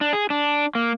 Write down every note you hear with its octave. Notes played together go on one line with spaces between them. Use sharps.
D4
G#4
D4
A#3